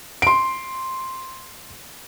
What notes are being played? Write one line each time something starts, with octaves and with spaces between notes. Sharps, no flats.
C6 D7